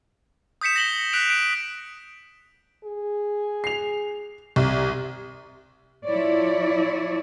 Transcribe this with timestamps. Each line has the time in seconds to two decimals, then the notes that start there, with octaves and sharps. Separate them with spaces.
0.61 D#6 G6 B6 C#7 E7
0.76 A#6 F#7 G7
0.89 G7
1.13 F#6 B6 D7 F7
1.30 D7
2.85 G#4
3.64 C7 F7
4.56 C2
6.05 F3 E4 C#5 D5